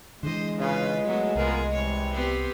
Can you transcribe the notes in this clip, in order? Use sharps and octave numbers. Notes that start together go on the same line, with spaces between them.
D3 E3 G#3 C5 D#5
C#3 F4 B4
E3 F#3 A3 B3
C2 B3 F4 G#4 A#4
C3 E3 G3 C#5
B3 C4 G4